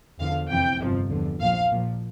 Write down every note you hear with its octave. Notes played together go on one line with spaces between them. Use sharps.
E2 D3 F3 F5
F2 C3 E3 G5
G1 F2 C3 F3
E2 D3 F3
A#1 A#2 F3 F5
A#1 A#2 F3